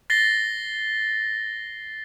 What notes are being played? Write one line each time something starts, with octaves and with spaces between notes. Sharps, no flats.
A6 A#6 C7 G7